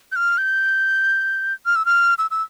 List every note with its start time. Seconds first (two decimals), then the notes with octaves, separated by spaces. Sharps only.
0.12 G6
0.16 F6
0.38 G6
1.66 F6
1.76 E6
1.86 F6
2.18 E6
2.31 E6